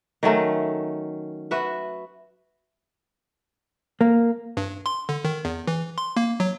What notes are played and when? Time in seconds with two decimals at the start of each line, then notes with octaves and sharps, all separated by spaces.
0.23 D#3 F#3 A3 C#4
1.51 F#4 B4 E5
4.01 A#3
4.57 G2
4.86 C6
5.09 D3
5.24 D#3
5.45 E2
5.67 E3
5.98 C6
6.17 A#3
6.40 F#3